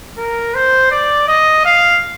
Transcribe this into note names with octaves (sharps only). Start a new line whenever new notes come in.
A#4
C5
D5
D#5
F5